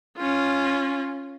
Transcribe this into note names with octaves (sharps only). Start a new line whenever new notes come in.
C#4 F4